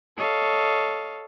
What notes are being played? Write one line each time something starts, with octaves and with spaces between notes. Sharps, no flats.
A4 C#5 D#5 F5